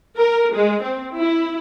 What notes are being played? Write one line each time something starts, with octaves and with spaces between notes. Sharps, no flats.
A#4
G#3
C4
E4